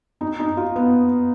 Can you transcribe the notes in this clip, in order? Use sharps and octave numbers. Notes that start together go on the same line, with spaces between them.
D#4
D#4
F4
B3